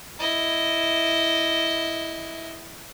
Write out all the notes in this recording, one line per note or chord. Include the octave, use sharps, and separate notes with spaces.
E4 D#5